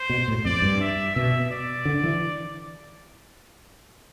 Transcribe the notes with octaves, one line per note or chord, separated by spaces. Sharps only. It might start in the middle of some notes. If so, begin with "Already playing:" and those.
Already playing: C5
B2
A2
F2 D5
G2
E5
B2 E5
D5
D3
E3